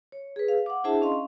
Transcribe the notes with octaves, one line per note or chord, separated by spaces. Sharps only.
C#5
G#4 B4
F5
F#5 D6
D4 E4 G#4 C5 E5 A5
C#4 D#5 F5 C6